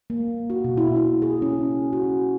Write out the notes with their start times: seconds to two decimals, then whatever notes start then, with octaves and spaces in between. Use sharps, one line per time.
0.10 A#3
0.50 F#4
0.64 B2
0.77 E4
0.96 E4
1.22 G#4
1.42 C#4
1.93 F#4